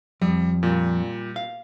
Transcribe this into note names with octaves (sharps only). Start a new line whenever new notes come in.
F2 G3
A#2 G3
F5